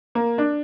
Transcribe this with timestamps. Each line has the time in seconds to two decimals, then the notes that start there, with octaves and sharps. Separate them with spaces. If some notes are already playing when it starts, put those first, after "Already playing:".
0.15 A#3
0.38 D4